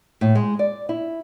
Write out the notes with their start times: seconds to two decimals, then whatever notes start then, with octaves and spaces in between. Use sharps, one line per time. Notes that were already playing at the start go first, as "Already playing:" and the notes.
0.21 A2
0.35 G#3
0.59 D5
0.89 E4